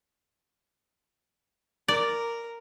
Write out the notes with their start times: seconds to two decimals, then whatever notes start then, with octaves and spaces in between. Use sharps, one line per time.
1.88 A#4 D5